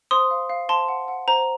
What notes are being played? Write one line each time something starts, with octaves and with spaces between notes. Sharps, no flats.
C5 C6 D#6
F5
F5
C5 A5 C6
F#5
F#5
C5 A#5